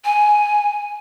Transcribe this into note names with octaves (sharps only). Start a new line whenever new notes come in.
G#5